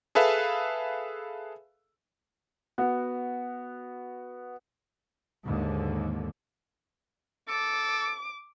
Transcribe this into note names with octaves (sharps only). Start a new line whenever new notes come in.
G#4 A4 B4 E5 F5
B3 F#4
D#2 G#2 D3
A4 D6